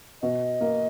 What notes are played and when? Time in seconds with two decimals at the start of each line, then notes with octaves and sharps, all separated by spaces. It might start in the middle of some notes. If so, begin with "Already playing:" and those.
0.22 B2 D#5
0.61 A#3